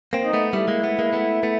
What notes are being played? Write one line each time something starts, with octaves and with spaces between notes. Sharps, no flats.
A#3 C4
D#4
A3 B3
G3 A3 E4
G#3 A#3
A3 B3
G#3 A#3
A3 B3
A3 B3